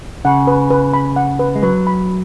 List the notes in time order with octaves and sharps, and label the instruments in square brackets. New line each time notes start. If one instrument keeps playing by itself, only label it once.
[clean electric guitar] C#3 [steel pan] F#5
[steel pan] B4
B4
B5
F#5
B4
[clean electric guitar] G#3
[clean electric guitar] F#3 [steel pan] B4
[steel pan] B5